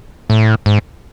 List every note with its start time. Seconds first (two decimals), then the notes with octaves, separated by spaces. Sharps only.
0.30 A2
0.66 G#2